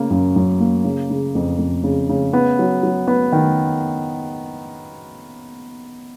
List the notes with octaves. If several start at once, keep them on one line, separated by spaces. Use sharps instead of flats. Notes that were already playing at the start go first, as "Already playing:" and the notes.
Already playing: C#3 A#3
F#2
F#2
A#3
C#3
C#3
F2
F2
C#3
C#3
B3
F#3
F#3
B3
D#3